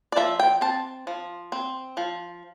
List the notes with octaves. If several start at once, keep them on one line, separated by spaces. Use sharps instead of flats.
D5
F3 E5
G5
C4 A5
F3
C4
F3